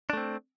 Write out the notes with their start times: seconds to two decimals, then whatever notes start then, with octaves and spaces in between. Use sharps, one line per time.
0.10 D4
0.13 A3
0.17 C4